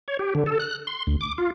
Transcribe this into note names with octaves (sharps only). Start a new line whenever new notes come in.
C#5
G4
D3
A4
F#6
C6
D2
D6
F4